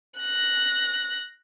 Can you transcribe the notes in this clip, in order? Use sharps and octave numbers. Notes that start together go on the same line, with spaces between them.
F#6 A#6